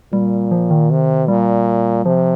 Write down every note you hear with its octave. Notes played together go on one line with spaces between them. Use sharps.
A#2 G3
F3
D#3
C3
A#2 G3
C3 F3